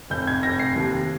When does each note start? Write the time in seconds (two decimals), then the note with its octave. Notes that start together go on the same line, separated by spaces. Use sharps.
0.10 F1 G6
0.27 G#6
0.43 F1 A#6
0.59 C7
0.76 D#2